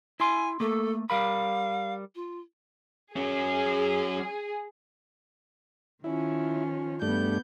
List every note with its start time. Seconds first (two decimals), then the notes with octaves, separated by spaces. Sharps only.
0.20 E4 G#5 C6
0.60 A3 A#3 A4
1.10 G3 A#4 F5 B5
2.15 F4
3.16 F#3 C#4 G#4
6.04 D#3 F3 C#4 E4
7.02 G2 A3 B3 D4 G6